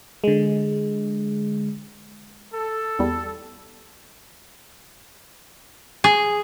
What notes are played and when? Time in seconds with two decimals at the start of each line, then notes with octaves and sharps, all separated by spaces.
0.24 D3 G#3
2.53 A4
2.99 E2 G3
6.04 G#4